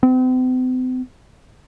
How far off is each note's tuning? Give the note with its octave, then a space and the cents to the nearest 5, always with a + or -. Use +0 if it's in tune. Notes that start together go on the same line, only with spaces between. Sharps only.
C4 -45